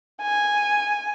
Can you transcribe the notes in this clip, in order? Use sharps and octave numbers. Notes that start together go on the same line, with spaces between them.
G#5